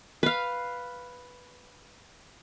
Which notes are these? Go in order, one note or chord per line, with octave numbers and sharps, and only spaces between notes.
B4 F5